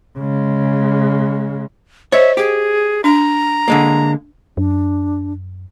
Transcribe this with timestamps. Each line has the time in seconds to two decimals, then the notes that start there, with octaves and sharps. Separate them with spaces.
0.18 C#3 G#3
2.12 C5 C#5 D#5 E5
2.37 G4 G#4
3.04 D4 A#5
3.68 D3 G#3 A#3
4.57 F#2 D4